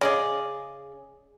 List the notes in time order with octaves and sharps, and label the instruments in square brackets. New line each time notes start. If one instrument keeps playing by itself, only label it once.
[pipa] C#3 [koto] G#4 D5 D#5